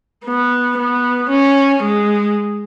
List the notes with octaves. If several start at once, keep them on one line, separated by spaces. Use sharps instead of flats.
B3
B3
C#4
G#3